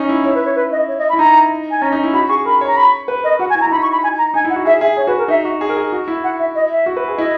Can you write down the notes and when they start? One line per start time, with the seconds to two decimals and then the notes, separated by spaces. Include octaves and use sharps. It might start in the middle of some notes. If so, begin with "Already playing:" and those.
Already playing: C#4 D#4
0.09 E4
0.24 E4 C#5
0.35 B4
0.45 C#5
0.56 B4
0.72 D#5
0.88 C#5
0.98 D#5
1.09 B5
1.13 E4
1.19 D#4 A#5
1.71 G#5
1.82 C#4 A#5
1.92 D#4
2.04 E4
2.14 F#4 B5
2.29 G#4 C#6
2.46 A#4 B5
2.61 C#5
2.67 A#5
2.77 B5
3.08 B4
3.23 A#4 D#5
3.39 F#4 F#5
3.50 G#5
3.55 E4
3.61 A#5
3.66 E4
3.72 D#4 B5
3.82 C#6
3.92 B5
4.03 G#5
4.18 A#5
4.34 D#4 G#5
4.45 E4
4.50 F#5
4.56 F#4
4.65 G#4 E5
4.81 G#4 E5
4.97 G#4 C#5
5.07 F#4 B4
5.18 A#4
5.28 D#4 E5
5.45 F#4
5.61 G#4
5.69 A#4
5.77 G#4
5.92 F#4
6.08 E4
6.24 F#5
6.39 E5
6.55 D#5
6.71 E5
6.86 F#4
6.97 B4
7.08 G#4
7.17 E4 D#5